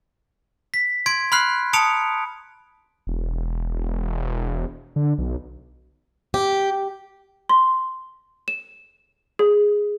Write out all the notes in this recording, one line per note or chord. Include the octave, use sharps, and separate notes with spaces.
B6
C6 G#6 D7
B5 C6 F6 F#6 C7
A5 A#5 D#6 C#7 D7 F7
E1
D3
B1
G4
C6
E7
G#4